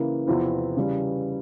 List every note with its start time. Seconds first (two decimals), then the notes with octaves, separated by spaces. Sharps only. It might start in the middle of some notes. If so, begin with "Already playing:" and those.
Already playing: C#3 E3 A#3 E4
0.27 E2 C3 F3 C4 E4
0.77 C#3 E3 G3